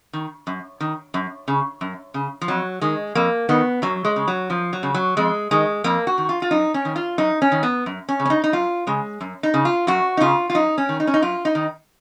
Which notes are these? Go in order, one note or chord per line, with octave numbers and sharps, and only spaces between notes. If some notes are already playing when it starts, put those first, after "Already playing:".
D#3
F#2
D#3
F#2
C#3
F#2
C#3
F3
F2 F#3
D#3 G#3
F2 A#3
D#3 B3
F#2 F#3
G#3
C#3
F#3
F#2 F3
F#3
C#3
F#3
F2 G#3
D#3 G#3
F2 A#3
F#4
D#3
F4
F4
F#2 D#4
C#4
D#3
F4
F#2 D#4
C#4
D#3
B3
F#2
C#4
C#3
C#4
D#4
D#4
F#2 F4
C#3 G#3
F#2
D#4
C#3
F4
F#2 F#4
D#4
C#3 F4
F4
F#2 D#4
C#4
D#3
D#4
C#4
D#4
F#2 F4
D#4
D#3